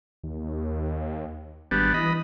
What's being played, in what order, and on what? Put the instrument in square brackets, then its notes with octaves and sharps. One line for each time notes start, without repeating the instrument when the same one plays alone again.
[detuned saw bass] D#2
[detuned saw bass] G#1 [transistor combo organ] G3 B3 D4
[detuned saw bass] E3 [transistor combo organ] D#5 B5